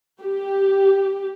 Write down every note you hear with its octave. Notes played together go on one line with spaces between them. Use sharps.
G4